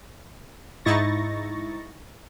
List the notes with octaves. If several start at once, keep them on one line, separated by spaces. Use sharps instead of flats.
G#2 D#4 E4 C#6 A6 A#6